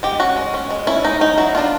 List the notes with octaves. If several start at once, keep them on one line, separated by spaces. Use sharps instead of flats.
G#3 G4
C#4 F#4
G#3
C#4
G#3
C#4 E4
G#3 D#4
C#4 D#4
F#3 E4
B3 D4 F4